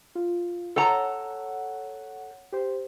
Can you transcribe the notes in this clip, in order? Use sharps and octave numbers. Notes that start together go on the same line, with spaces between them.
F4
A4 C#5 F#5 A#5
G4 C5